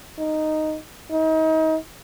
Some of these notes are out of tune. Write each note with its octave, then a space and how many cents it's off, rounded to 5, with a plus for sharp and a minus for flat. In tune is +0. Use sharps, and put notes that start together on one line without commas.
D#4 -5
D#4 +35